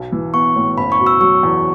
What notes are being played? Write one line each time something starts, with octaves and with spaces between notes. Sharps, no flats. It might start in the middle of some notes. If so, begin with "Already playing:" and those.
Already playing: B1
E3
B3 C#6
A2
F#1 B5
C#6
B2
E6
F#3 C#6
E2